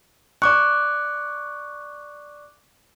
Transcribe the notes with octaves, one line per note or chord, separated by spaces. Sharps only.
D5 C#6 D6 F#6